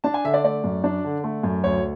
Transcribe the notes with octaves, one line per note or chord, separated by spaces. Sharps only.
D4 A5
G#5
D3 E5
D5
A3 D5
F#2
D4
D3
A3
F#2
D2 C#5